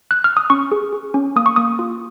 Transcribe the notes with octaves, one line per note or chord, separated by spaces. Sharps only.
F#6
F6
D#6
C#4 C#6
G#4
G#4
C#4
A#3 D#6
C#6
A#3 D#6
F4